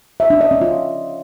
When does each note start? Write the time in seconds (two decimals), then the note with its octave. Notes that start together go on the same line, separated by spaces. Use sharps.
0.20 E5
0.30 D4
0.41 D#5
0.51 C#4
0.61 F4